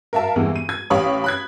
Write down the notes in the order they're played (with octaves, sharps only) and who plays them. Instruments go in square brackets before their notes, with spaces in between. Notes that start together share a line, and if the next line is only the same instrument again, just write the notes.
[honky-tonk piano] A#4 E5 F5 A5
E2 G2 E3 G#3 B3
D#7
G#6
A1 G4 C#5 F5 B5 D#6
B5 F#6 G#6